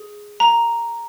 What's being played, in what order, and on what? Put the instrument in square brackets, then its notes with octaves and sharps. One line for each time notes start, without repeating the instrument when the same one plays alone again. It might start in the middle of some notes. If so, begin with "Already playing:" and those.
Already playing: [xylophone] G#4
A#5